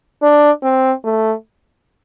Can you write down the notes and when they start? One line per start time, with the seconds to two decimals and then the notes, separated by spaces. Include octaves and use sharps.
0.22 D4
0.63 C4
1.04 A3